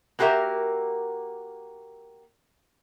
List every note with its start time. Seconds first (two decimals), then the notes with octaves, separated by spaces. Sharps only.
0.19 A#3 F#4 G4 A#4 E5